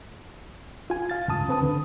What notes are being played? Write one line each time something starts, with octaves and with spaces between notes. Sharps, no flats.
F4 G#5
F5 A6
C#2 G2 A5 D#6
D2 C4 B4 A5 D#6
D3